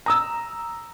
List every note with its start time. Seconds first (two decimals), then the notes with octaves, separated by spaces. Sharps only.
0.06 A#5 D#6 E6